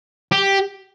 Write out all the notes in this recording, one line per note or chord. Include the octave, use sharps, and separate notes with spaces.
G4